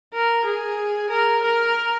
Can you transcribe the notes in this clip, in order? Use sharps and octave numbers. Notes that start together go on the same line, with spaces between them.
A#4
G#4
A#4
A#4